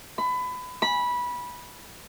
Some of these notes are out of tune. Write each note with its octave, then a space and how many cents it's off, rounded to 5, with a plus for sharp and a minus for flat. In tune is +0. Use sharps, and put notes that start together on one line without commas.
B5 +25
B5 -15